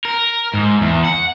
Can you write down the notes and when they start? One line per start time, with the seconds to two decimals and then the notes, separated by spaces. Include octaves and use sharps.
0.05 A#4
0.54 G#2
0.81 E2
1.04 F#5